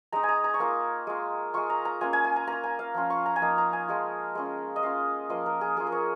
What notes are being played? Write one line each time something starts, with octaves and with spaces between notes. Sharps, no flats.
G#3 D#4 A#5
G#5
A#5
A#5
C#6
A#3 F4 A#5
G#3 F4
G#3 F4 C#6
A#5
A#5
A#3 C#4 F4 G#5
G#5
G#5
A#5
A#3 F4 A#5
G#5
F5
F3 C#4 F4
C#6
A#5
G#5
F3 A#3 D#4 F5
A#5
G#5
F3 G#3 F4
G#3 C#4 F4
D#5
G#3 C#4 F4 F5
F3 A#3 F4 D#5
A#4
G#4
A#3 F4 G#4
A#4
C#5